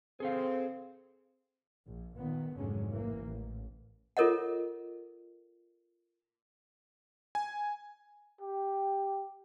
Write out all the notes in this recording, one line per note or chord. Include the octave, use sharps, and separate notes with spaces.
C4 G#4 A4 F5
A#1
A#2 D#3 B3
F1 G#2 D3 F#3 G#3 C#4
A1 E3 A#3
A1
F4 A4 A#4 C#5 D#5 F#5
G#5
G4